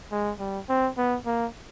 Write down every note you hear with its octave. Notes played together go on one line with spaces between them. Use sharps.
G#3
G3
C4
B3
A#3